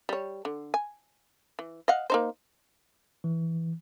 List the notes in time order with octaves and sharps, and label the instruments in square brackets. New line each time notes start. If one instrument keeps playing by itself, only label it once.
[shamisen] G3 C#5
D3
G#5
E3
D#5 F5 F#5
A#3 D#4 C5
[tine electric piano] E3